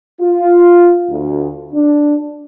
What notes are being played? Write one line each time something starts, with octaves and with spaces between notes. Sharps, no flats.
F4
D2
D4